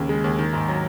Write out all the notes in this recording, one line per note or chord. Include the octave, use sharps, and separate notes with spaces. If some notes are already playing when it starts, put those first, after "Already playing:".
Already playing: D#2 C#3
G#3
D#2
D#3
G#2
F#3